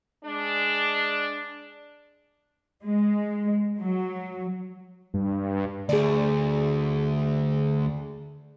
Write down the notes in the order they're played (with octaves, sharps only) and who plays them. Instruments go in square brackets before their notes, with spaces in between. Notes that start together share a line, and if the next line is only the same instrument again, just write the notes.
[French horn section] G#3 D4
[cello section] G#3
F#3
[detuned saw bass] G2
[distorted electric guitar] D2 [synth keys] G#4 D5